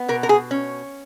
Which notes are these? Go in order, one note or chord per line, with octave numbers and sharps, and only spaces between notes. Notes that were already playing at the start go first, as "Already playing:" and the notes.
Already playing: B3
B2 A#4
A#4
G#4
C#4